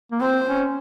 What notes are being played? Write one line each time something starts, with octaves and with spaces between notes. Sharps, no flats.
A#3
C4 C5
C#4